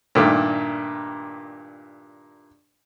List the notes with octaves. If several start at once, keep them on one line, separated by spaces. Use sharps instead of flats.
G2 A#2 D#3 A3